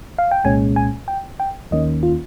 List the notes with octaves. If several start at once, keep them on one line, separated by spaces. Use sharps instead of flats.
F5
G5
C2 A#2 G#3 C#4 G#5
G#5
G5
G5
D#2 D#3 A#3 C#4 D#5
F4